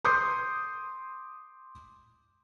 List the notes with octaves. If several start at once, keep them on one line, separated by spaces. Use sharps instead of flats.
C6 D6 D#6 G6 C7